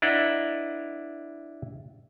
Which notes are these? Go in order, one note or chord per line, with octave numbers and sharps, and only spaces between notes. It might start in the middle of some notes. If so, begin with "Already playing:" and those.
D4 E4 B4 D#5 F#5 A#5